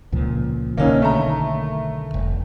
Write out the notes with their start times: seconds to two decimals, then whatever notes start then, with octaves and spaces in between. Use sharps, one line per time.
0.12 C#2 A#2 F3
0.77 B1 D3 D#3 A#3 C#4 D#4
1.02 A3 A#5
2.14 F1